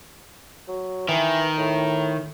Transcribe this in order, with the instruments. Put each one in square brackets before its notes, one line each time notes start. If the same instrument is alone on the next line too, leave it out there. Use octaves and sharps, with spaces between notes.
[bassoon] F#3
[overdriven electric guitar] D#3 [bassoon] E3
[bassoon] A2